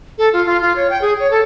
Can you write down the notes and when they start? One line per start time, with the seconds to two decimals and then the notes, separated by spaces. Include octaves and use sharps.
0.18 A4
0.33 F4
0.46 F4
0.61 F4
0.76 C#5
0.90 G5
1.02 G#4
1.20 C#5
1.31 A4